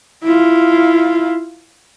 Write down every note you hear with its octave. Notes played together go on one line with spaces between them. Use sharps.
E4 F4